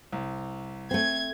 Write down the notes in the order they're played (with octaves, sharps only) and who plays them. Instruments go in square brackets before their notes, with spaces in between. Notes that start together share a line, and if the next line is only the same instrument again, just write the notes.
[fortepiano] C2
[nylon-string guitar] A3 C4 [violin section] G#6